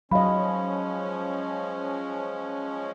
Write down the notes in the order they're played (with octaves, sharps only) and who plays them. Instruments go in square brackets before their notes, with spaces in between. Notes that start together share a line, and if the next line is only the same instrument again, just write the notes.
[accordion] F3 G#3 C#4 [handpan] F#3 D#5 [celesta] F5 B5